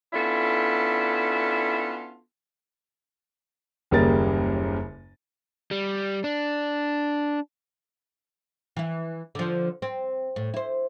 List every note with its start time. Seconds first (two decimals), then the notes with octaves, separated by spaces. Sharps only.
0.13 B3 C#4 D4 E4 F4 A4
3.91 F#1 D#2 C#3 G3 A#4 A6
5.71 G3
6.24 D4
8.77 E3 E4
9.35 D3 F3
9.82 C4
10.36 A2
10.54 E4 C5